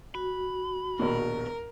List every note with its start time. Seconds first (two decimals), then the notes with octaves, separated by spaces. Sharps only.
0.15 F#4 B5
0.99 A#1 D#2 B2 A#4